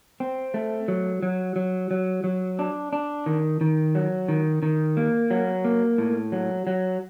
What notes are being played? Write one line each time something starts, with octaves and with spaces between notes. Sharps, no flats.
C4
A3
F#3
F#3
F#3
F#3
F#3
D4
D4
D#3
D#3
F#3
D#3
D#3
A#3
F#3
A#3
A2
F#3
F#3